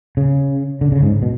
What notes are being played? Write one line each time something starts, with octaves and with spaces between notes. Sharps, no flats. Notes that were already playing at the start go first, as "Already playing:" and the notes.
C#3
D3
C#3
G#2
B2